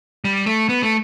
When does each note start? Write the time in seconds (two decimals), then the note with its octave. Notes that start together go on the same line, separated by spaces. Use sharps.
0.24 G3
0.46 A3
0.69 B3
0.83 A3